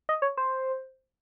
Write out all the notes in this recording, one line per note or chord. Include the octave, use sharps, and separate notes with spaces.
D#5
C#5
C5